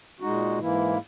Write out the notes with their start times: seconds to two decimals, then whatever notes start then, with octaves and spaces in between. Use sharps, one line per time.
0.20 A#2 G#3 D#4 F#4
0.59 G#2 E3 A#3 E4